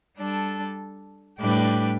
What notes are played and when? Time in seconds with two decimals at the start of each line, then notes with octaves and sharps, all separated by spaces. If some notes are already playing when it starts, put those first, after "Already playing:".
0.18 G3 D4 A4
1.40 A2 G3 D4 G4 B4